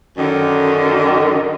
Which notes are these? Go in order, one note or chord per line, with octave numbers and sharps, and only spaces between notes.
F#2 D3 D#3